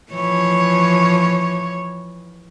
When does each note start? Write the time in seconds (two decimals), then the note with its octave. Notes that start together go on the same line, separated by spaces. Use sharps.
0.11 E3 F3 C#5